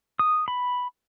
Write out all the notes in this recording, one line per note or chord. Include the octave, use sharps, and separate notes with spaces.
D#6
B5